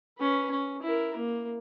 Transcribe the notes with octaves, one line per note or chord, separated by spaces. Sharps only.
C#4 B4
C#4
E4 A#4
A#3